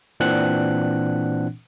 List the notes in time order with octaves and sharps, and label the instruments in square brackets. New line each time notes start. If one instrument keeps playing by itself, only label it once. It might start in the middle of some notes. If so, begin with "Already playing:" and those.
[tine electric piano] A#2 E3 C4 D4 F#5 F#6